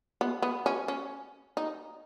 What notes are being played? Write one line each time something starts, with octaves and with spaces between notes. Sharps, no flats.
B3
B3
C#4
C#4
D#4